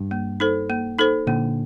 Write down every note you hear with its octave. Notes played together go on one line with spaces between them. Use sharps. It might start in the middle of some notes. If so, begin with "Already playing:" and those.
Already playing: G2
A#3
D#4 A4 C5
A#3
D#4 A4 C5
A#2 D3 A#3